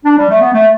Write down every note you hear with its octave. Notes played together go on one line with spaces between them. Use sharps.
D4
G3
A3
B3
A3